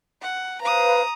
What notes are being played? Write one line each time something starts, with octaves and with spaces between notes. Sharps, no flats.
F#5
B4 C5 F5 A#5 D#6